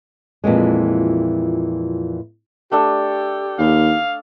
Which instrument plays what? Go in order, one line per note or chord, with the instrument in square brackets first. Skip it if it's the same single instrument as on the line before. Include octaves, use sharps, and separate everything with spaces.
[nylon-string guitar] F2 A#2 E3 G#3
[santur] A3 D4 A4 [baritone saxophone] G4
[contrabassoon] D#2 [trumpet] F5